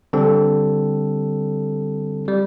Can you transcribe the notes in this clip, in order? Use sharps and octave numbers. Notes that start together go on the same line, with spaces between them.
D3 G3 C4 A4
G3